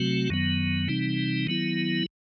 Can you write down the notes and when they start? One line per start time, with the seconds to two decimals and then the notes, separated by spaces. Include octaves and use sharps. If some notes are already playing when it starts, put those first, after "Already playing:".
Already playing: C3 F#3 A3 C4 F#4
0.30 F#2 D#3 F#3 B3
0.88 C3 E3 G3 C4 D#4
1.47 D#3 F#3 B3 E4